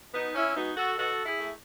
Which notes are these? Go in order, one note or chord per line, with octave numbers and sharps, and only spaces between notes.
B2 B3 D#4
C#4 E4
G#3 B3 D#4 F#4
F#4 A4
B2 F#4 A4
E4 G#4
A3